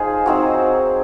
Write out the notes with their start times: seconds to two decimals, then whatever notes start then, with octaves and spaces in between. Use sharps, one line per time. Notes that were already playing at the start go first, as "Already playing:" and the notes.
Already playing: D#4 F4 G#4 C5
0.26 F#3 C4 D#4